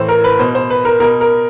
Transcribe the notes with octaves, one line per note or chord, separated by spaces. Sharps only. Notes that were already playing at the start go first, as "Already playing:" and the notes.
Already playing: A2 E3 C5
A#4
B4
B2 C5
C5
B4
A#4
B2 A#4
A#4